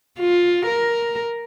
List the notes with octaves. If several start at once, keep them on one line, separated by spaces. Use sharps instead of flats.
F4
A#4